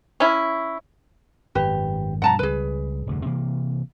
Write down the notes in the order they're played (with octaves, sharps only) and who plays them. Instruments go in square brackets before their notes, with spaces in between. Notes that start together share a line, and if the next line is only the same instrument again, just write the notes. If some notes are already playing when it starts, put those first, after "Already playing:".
[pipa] C#4 E4
[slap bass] G#1 F#2 [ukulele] G4 B4
[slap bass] G2 B2 F3 [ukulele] F#5 A5 A#5
[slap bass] C#2 G3 [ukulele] G#4 B4
[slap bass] F1 D2 G2
C3 E3 A#3